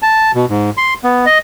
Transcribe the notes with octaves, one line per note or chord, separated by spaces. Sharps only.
A5
B2
G#2
C6
B3
D#5